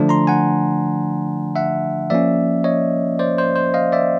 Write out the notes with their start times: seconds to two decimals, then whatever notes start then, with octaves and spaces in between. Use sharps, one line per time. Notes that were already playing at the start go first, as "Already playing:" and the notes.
Already playing: D3 F3 A3 D4
0.09 A#5 C6
0.27 F#5 G#5
1.56 E5 F#5
2.10 F3 A#3 C#4 D5 E5
2.64 C#5 D#5
3.19 C5 D5
3.38 C5
3.56 C5
3.74 D#5 F5
3.92 D5 E5